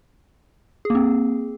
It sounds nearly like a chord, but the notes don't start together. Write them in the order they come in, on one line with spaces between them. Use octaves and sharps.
G#4 A#3 C4